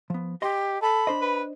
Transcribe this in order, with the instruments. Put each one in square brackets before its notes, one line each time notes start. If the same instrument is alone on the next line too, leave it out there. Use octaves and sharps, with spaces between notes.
[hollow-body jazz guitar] F3 B3
[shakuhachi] G4 [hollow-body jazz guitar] D#5 C6
[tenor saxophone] A4 [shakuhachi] B5
[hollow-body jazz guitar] D4 C5 D#5
[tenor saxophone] B4